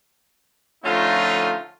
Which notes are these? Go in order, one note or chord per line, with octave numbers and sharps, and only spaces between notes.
D3 F3 A3 C#4 D#4 F4